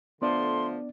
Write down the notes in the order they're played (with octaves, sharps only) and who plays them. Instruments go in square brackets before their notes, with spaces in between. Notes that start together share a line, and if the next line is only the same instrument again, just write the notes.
[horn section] D3 F3 A3 [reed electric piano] B3 D4 D5 [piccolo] C6